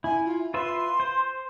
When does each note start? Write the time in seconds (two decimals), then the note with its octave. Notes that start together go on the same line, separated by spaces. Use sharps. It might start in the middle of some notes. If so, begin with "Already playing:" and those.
0.04 E4 G#5
0.25 F4
0.54 F4 B4 E5 C6
1.00 C5